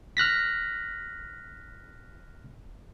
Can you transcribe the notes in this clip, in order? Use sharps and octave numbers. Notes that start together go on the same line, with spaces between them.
F6 F#6 A#6 B6